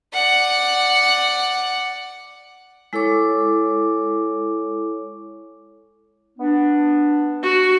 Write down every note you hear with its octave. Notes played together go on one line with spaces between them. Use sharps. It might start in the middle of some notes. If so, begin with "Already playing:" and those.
D5 F#5
G#3 E4 A4 C#5 C#6 D6
B3 D4
F#4